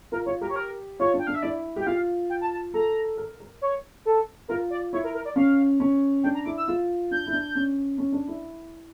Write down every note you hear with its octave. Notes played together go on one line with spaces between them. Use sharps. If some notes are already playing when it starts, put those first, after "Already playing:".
F4 A#4
F4 C#5
G4 A#4
C#5
A#4
F4 C#5
D4
G5
D4 F5
E5
E4 D5
G4 G5
F4 F5
G5
A5
A5
A4 A#5
A#4
A#4
C#5
A4
F4 A#4
D5
E4 C#5
A#4
A#4
D5
C#4 F5
C#4
D4 G5
A#5
E4 D6
E6
F4
D4 G6
E4
D4
C#4
C#4
D4
E4